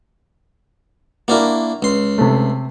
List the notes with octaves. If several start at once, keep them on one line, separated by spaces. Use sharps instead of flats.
A#3 D4 E4 F#4 A#4
C#2 C6
C3 A3